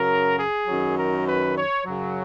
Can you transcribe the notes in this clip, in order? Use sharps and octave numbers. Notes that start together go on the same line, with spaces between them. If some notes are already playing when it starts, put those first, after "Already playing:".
Already playing: F#2 C#3 F#3 A#4
G#4
F#2 D#3 F#3
A#4
B4
C#5
F#2 C#3 F#3